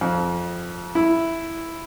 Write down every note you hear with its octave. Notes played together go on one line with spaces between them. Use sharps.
F2
E4